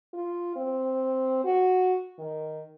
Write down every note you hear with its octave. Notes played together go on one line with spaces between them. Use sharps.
F4
C4
F#4
D#3